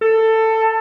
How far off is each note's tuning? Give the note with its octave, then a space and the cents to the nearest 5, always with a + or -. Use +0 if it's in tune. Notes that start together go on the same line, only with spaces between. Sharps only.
A4 +15